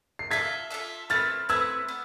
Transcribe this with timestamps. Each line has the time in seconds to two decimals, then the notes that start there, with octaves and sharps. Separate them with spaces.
0.19 C7
0.31 F4 A4 E5 G#6 B6
0.70 F4 A4 E5
1.10 A3 C4 E4 B4 F6 A6
1.49 A3 C4 E4 B4 E6 G#6
1.89 B3